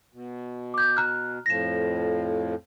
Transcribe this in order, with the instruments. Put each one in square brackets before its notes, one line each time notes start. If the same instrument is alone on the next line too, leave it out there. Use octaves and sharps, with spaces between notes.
[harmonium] B2
[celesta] D6 G6
A#5 F6 F#6
[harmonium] F2 A2 F3 [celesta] A#6 E7